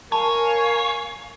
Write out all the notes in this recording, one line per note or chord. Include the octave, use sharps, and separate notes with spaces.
A#4 C#5 F5 G#5 A5 B5